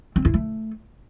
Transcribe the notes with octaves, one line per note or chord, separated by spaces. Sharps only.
C4
E4
A3